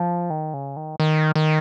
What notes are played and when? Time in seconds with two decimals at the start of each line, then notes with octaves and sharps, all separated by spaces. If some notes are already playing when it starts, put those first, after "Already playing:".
Already playing: F3
0.30 D#3
0.54 C#3
0.77 D#3
1.00 D#3
1.36 D#3